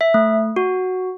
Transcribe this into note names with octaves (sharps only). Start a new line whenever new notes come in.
E5
A3
F#4